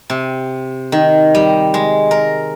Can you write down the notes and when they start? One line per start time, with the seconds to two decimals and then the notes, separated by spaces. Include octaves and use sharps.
0.10 C3
0.92 D#3
1.35 G3
1.74 G#3
2.11 A#4